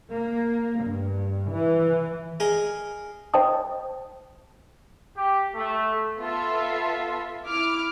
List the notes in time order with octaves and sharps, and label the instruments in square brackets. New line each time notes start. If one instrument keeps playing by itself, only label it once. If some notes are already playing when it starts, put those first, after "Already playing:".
[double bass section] A#3
G2
E3
[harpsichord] G#4 A#4 D#5
[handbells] C5 D#5 G5 A5 D#6
[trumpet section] G4
A3
[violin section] B3 F4 A4 E5
E4 D6 F6